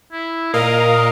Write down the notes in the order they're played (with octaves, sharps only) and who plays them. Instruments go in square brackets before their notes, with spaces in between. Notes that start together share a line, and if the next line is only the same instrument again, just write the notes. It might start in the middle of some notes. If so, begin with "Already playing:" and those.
[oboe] E4
[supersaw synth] A#2 A#4 F5 [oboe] D#5